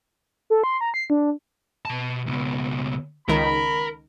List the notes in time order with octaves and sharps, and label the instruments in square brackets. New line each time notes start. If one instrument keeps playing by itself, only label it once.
[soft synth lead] A4
C6
A#5
C7
D4
[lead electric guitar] B2 A5
C#2 B2
[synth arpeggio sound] C#2 D#3 [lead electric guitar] A#4 [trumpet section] B5